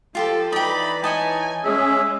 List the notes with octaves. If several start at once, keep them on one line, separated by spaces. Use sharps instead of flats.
F3 F4 G4 A4 C6
E3 D#4 D5 G5 B5
D#4 C#5 D#5 G#5 A5
G#3 C#4 G#4 E5